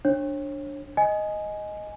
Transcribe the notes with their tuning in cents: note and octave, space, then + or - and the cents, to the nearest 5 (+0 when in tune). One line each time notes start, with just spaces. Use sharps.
D4 +0 C#5 -35
D#5 +0 G#5 +5